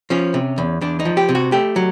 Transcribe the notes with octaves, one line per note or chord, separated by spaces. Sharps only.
F3 C#4
C3
E2
E2 D4
D#4
F3
G4
C3
F#4
A3 G4
F#3